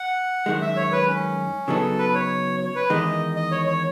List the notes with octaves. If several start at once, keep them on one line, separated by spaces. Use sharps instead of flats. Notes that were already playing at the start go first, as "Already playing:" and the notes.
Already playing: F#5
F#2 D#3 G#3
E5
C#5
B4
C#4
C#3 F#3 B3 D#4 A4
B4
C#5
C#5
B4
E2 D#3 G#3 D#5
D#5
C#5
C#5